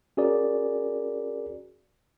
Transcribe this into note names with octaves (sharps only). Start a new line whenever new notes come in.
C#4 F#4 G#4 A#4 D5